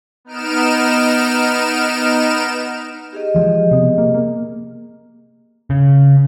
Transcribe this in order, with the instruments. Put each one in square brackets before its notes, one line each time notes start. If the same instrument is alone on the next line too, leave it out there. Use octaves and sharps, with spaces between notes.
[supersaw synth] B3 D#4 F6 D7 E7
[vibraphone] G4 G#4 D#5
[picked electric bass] E3 F3 G#3
C3 B3
A#3
A#3
C#3